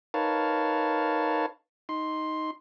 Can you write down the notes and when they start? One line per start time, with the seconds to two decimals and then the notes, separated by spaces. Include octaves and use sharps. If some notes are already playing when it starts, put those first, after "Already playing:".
0.14 D#4 A#4 B4 C#5 F5 A5
1.89 D#4 C6